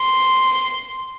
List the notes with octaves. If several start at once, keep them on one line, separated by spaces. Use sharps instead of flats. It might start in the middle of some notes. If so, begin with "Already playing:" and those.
Already playing: C6